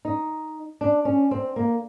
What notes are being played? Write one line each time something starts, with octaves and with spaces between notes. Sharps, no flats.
D#4
D4
C#4
C4
A#3